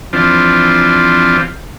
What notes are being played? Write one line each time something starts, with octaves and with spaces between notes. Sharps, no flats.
E3 F3 C4 D4 F4